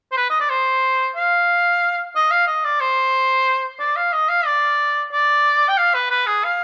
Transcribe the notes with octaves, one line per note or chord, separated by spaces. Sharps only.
C5
B4
D#5
D5
C5
F5
D#5
F5
D#5
D5
C5
D5
F5
D#5
F5
D5
D5
G5
F5
B4
B4
G#4
F5